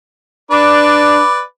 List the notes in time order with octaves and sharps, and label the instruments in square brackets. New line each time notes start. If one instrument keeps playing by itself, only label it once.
[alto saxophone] D4 [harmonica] B4 D5